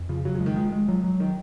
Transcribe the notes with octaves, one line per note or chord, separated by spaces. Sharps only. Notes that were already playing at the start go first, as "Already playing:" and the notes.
Already playing: F2
C#3 F3
C#3 F#3
F3
G#3
D#3
F3 G#3
G#3
F3 F#3
F#3
D#3